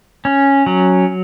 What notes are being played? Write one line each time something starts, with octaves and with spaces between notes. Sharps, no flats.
C#4
F#3